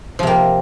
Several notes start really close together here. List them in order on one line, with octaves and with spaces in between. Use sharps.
F3 C3 A#3